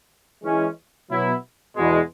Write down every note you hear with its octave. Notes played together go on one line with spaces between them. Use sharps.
E3 G#3 C#4
B2 F#3 B3 E4
E2 B2 G#3